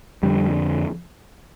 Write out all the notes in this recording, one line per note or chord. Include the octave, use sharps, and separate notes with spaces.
F2 D3 G3